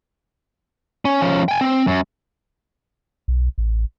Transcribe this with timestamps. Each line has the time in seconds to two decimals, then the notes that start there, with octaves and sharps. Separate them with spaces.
1.05 C#4
1.22 F3 C#4
1.49 G5 G#5
1.61 C4
1.87 F#2
3.28 B1
3.58 A1